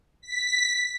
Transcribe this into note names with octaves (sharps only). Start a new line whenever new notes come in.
B6